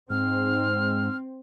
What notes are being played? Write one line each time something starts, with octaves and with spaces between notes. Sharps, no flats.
G#2 C4 F6